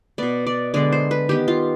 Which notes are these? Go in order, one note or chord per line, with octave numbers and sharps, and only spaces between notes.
B2 B3 D5
D5
D3 G#3 B3 D5
C5
B4
D#3 B3 G4
F4